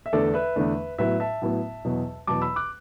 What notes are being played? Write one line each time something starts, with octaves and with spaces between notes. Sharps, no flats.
E5
E2 D3 A3 D4 A4 D5
B4 E5
E2 D3 A3 D4
A2 F#3 B3 E4 B4 E5
E5 A5
A2 F#3 B3 E4
E2 B2 F#3
E2 B2 F#3 A5 D6
B5 E6
D6 F#6